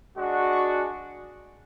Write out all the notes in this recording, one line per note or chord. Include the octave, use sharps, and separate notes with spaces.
G#3 D4 F#4
C#6